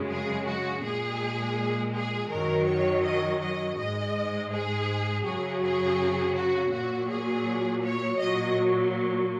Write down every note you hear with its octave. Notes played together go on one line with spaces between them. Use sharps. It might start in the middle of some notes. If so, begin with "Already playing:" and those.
Already playing: F#2 C#3 G#3
G#4
F#4
A#2 G#3 G#4
G#4
F#2 D#3 F#3 A#4
C#5
D#5
D#5
G#2 G#3 D#5
G#4
F#2 C#3 F#3 G#4
G#4
F#4
A#2 F#3 F#4
G#4
C#5
A#2 F#3 D#5